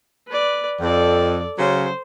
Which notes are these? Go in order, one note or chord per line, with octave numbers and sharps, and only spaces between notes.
B4 D5
F2 A4 D5
C#3 F#3 C#4 C5